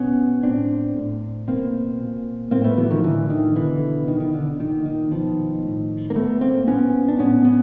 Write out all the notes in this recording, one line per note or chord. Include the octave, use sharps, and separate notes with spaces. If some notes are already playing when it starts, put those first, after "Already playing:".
Already playing: B2 B3 C#4
A2 C4 D4
A2
B2 A#3 C4
A#2
A2 A#3 C4
A3 B3
E3 F#3
D#3 F3
A2 D3 E3
D#3
B2 D3 E3
B2 D#3
D#3
D3
A#2 D#3
D#3
B2 D#3 F3
A2
A#3
A#2 A3 B3
A#3 C4
A#2 B3 C#4
D4
A2 B3 C#4
B3 C#4